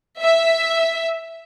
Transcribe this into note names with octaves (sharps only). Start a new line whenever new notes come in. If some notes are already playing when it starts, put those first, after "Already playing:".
E5